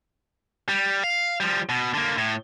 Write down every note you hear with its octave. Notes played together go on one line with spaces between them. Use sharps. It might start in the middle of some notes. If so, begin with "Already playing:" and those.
G3
F5
F3 G3
B2
D3 A#3
A2